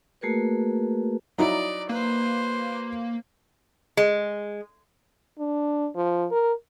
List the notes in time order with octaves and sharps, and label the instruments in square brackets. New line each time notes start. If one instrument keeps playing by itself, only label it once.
[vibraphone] A3 A#3 F#4 G#4 A#4 B4
[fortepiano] F#3 D#4 E4 [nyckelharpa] D5 D#5
[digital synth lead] A#3 [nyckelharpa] B4 C5
[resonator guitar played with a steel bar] G#3
[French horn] D4
F3
A#4